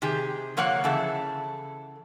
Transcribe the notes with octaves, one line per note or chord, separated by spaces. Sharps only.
C3 D#3 G4 G#4
D3 F3 A#3 C#5 F#5
C#3 E3 G#4 A4 E5